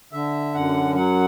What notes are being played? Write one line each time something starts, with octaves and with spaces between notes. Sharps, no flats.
D3 E5
F#2 F#5
F#3 F#5